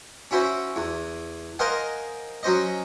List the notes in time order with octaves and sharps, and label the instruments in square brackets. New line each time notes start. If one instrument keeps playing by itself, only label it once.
[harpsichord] C#4 E4 F#4 C5
E2
A#4 C5 D#5 F5 F#5 G#5
F#3 C#4 C5 D#5